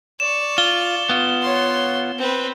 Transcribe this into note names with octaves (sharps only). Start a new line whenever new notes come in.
D5 C#6 E7
F4 G7
B3 F4
C#5 C6
C4 B4